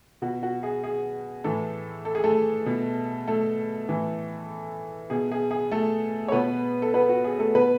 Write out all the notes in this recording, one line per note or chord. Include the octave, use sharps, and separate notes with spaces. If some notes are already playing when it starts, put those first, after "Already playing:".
B2 F#4
F#4
G#4
G#4
A2 E3 A3 A4
A4
G#4
A3 A4
B2
A3 A4
A2 E3
B2 G#4
G#4
G#4
A3 A4
C#5
B2 B3 B4
A4
B3 B4
F#4
G#4
A3 A4
B2 B3 B4